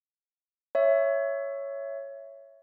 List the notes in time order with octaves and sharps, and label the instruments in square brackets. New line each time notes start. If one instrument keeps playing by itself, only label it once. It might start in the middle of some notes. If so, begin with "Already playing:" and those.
[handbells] C#5 E5